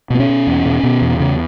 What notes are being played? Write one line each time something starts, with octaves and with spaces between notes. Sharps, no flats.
B2 B3
C#4
B2
E2
B2
B2
E2
C#3